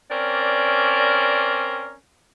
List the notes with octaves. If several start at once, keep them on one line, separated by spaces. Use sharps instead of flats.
C4 C#4 A#4 D5